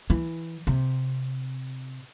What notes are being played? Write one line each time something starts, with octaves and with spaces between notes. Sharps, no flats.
E3
C3